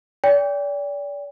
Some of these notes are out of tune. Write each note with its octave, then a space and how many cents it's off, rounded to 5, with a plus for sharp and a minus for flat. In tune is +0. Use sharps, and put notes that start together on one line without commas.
D5 -40 G5 +30